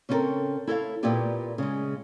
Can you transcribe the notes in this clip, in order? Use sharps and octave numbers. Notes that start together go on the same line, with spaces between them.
C#3 C4 C#4 F4 A4 A#4
E4 A4 C#5 F5
A#2 B3 E4 F4 G4 D5
C#3 G#3